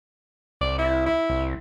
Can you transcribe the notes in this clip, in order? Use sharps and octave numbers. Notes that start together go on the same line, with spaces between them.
C2 D5
E4
E4
C2